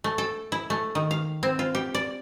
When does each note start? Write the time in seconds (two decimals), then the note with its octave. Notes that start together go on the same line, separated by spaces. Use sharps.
0.04 A3
0.18 A4
0.52 E4
0.70 A3
0.95 D#3
1.11 F5
1.43 C4
1.59 F4
1.75 G4
1.95 D5